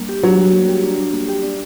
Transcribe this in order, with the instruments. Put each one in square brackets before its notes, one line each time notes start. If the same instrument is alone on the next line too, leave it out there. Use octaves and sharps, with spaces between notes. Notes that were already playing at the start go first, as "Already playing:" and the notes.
Already playing: [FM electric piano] G3 A#3 D4
G4
[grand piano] F#3 [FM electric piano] D4
[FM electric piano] G3
A#3
G4
D4
G3
A#3
G4
D4